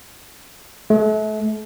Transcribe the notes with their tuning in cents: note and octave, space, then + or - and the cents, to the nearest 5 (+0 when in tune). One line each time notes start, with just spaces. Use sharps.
A3 -35